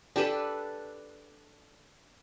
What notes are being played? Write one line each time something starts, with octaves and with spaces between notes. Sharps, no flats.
D4 G4 A4 B4